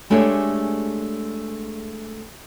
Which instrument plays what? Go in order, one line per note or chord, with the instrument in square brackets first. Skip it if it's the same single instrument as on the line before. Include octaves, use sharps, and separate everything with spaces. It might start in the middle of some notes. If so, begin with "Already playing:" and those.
[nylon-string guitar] G#3 A3 D4 G4 G#4 C#5